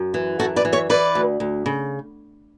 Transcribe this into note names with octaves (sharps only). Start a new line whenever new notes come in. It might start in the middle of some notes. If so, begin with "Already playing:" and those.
Already playing: F#2
E3
F#2 F#4 A4
B4 D5
E3
C#5 E5
E3 B4 D5
D2
D2
C#3